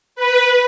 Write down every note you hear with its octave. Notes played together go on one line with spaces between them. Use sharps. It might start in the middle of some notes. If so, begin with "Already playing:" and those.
B4